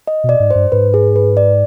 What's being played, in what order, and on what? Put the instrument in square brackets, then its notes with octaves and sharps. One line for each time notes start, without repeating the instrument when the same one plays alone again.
[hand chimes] D#5
[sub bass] B2
[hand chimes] D5
[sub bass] G#2
[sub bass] G2 [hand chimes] C5
[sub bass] G#2 [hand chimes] B4
[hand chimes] G#4
B4
D5